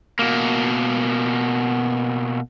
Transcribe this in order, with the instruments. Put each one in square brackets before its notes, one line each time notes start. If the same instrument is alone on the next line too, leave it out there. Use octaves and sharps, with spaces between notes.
[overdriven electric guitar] B2 A#3